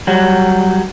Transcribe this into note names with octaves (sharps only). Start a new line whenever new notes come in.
F#3 G3